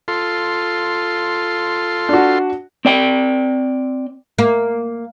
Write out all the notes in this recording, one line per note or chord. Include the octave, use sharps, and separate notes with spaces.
F4 A4 C6
D4 F#4
C4 D5 G5
A#3